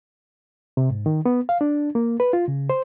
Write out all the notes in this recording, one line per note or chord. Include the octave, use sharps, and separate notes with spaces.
C3
G#2
D#3
B3
F5
D4
A#3
B4
F4
C#3
C5